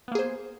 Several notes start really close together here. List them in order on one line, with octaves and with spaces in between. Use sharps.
B3 A#3 G#4 C5